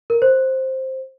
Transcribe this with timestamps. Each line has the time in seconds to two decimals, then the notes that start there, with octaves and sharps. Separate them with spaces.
0.10 A#4
0.22 C5